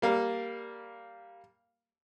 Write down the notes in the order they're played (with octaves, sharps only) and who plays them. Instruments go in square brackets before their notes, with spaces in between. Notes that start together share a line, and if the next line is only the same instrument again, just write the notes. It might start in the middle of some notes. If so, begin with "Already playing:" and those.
[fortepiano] G3 A#3